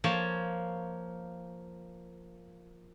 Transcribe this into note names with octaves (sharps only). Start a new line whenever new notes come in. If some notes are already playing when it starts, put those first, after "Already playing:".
F3 A#3 C#5 A5